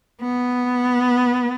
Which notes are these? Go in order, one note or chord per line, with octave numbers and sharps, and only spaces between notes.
B3